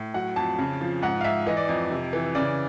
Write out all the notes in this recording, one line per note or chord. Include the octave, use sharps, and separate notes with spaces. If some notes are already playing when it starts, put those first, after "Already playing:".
Already playing: A2
F#3 F#5
F2 A5
C#3
F3
G#2 F#5
F5
G#2 E5
E3 D#5
D5
F2 D#5
C3
E3
C#3 D5